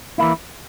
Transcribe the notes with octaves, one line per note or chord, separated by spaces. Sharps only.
E3 A#3 E4